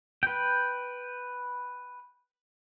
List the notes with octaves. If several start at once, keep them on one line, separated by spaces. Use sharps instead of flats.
B4 G5